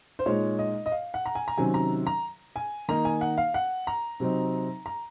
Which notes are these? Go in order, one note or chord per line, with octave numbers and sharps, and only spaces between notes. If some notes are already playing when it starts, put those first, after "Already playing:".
C5
A#2 G#3 D#4 C#5
D#5
D#5
F5
F#5
A#5
G#5
A#5
C3 D#3 F#3 C#4 G#5
A#5
A#5
G#5
D#3 A#3 D#4 A#5
G#5
F#5
F5
F#5
A#5
C3 F#3 C4 D#4
A#5